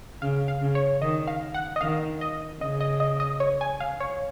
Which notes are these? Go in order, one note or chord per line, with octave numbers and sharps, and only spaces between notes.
C#3 F5
F5
C#3
C#5
D#3 D#5
F5
F#5
D#5
D#3 F5
D#5
C#3 D#5
D#5
D#5
D#5
C#5
G#5
F5
C#5